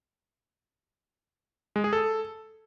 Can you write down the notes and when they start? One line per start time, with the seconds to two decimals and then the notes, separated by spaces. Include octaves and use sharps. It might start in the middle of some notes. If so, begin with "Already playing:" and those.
1.76 G#3
1.84 G#4
1.93 A4